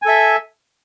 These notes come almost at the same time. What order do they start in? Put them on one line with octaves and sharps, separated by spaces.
G#5 A4 E5